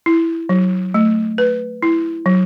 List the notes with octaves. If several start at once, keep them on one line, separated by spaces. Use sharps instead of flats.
E4
F#3
A3
B4
E4
F#3